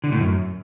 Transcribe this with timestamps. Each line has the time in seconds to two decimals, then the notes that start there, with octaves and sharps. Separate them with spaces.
0.04 D3
0.12 A2
0.20 F#2